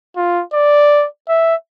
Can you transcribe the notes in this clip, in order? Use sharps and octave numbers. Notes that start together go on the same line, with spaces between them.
F4
D5
E5